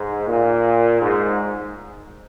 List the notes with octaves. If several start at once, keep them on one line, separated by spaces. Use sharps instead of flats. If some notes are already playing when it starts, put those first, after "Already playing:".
Already playing: G#2
A#2
G#2